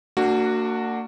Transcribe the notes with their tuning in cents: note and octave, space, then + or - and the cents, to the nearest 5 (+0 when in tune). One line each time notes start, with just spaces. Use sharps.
A#3 -40 D4 +0 F#4 +0